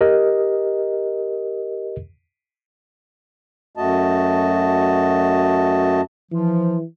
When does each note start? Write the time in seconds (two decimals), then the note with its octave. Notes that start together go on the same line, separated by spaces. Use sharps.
0.01 G4 A#4 D#5
3.77 F#2 A3 F#4 D#5 A5
6.32 E3 F3